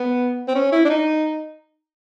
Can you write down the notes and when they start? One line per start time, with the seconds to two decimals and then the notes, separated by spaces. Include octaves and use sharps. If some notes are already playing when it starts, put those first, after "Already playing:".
Already playing: B3
0.48 C4
0.55 C#4
0.72 E4
0.85 D4
0.90 D#4